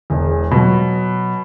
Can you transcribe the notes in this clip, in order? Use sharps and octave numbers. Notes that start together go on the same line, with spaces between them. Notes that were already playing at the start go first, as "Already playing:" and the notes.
E1 E2
B2 F#3